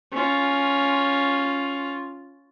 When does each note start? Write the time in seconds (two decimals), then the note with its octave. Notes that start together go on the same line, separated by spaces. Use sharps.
0.12 C#4 F4